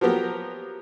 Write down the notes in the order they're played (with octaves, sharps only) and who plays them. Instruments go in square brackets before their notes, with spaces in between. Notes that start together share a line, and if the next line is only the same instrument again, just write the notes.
[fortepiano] F3 F#3 B3 G4 A#4